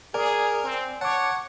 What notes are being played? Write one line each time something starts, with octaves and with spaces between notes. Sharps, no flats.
G#4 A#4 D5 G#5
C4
C#5 F#5 A5 D6